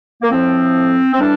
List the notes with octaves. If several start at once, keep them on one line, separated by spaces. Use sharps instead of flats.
A#3
A2 F3 C4
C4
A2 E3 G3 D4